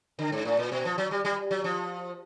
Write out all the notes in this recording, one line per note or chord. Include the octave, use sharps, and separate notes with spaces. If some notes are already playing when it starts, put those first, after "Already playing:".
D3
G#2
A2
A#2
B2
F3
F#3
G3
G3
F#3
F3